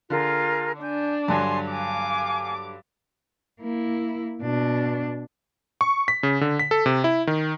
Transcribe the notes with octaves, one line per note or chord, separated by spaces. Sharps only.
D3 F4 G#4 A#4
D4 G#5 G6
G2 D3 F#3 G#5 A5 C6
F5 G#5 D6
A#3 E4
B2 D4
C#6
B6
C#3
D3
B6
A4
C3
E4
D#3